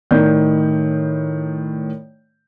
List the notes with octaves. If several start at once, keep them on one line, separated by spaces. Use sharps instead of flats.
A2 D#3 D5 G6